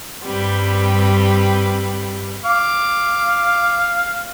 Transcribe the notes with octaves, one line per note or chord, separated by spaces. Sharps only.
G2 G3 C4 G4 B4
F5 D6